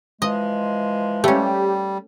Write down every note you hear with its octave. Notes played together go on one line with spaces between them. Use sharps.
E3 F3 G#3 D#5
G3 A3 C#4 G4